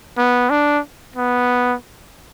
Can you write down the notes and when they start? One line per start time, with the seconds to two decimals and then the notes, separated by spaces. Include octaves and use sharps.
0.18 B3
0.50 D4
1.16 B3